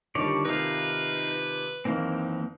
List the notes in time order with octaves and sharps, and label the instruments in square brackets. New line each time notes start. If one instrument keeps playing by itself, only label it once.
[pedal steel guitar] D3 C#5 D5 [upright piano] D#3 F3 G3
[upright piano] C3 D#3 F3 [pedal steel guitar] D#4 F5 [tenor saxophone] B4
[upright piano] F#1 D#3 F5 [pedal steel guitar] E3 A#3 C4